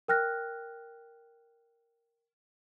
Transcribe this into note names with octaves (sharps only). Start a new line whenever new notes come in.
A#4 G5 F6 F#6 A#6